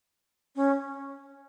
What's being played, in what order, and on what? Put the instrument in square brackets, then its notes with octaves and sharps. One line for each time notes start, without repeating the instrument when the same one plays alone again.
[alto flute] C#4